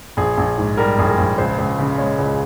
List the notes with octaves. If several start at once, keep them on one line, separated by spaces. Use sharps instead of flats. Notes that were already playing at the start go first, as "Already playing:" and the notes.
A#1 G#4
A#1
G#2
G3 A#4
A#1 G#4
A#4
A#1
C#2 C5
C#2
C#3
G#3 C#5
C#2